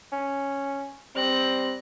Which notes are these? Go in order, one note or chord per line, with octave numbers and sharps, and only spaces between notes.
C#4
G3 C4 F#6 A#6